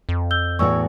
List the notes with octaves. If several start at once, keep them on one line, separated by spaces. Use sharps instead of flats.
F2
E6 G6 G7
E2 A2 F#4 C#6 E6